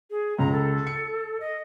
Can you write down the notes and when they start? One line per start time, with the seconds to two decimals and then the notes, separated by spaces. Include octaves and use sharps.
0.10 G#4
0.38 C#2 A#5
0.52 A4
0.87 C#7
1.40 D#5